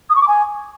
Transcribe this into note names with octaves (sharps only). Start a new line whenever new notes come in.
D#6
C#6
D6
G#5